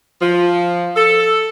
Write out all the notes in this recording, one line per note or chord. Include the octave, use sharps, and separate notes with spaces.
F3
A4